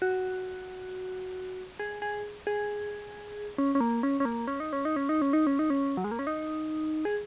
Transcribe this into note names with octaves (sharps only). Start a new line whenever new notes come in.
F#4
G#4
G#4
G#4
C#4
C#4
A#3
C#4
C#4
A#3
C#4
D#4
C#4
D#4
C#4
D#4
C#4
D#4
C#4
D#4
C#4
F#3
G#3
A#3
C#4
D#4
G#4